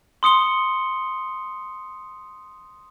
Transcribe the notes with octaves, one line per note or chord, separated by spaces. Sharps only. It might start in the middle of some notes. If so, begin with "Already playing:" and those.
C6 D#6 C#7 G7